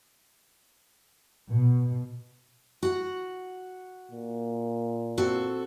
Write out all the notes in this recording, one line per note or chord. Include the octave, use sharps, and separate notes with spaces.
B2
F#4 F#5
A#2
C4 F#4 A4